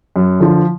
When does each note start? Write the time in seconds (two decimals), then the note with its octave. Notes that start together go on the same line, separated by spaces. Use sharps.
0.16 F#2
0.40 D3 F3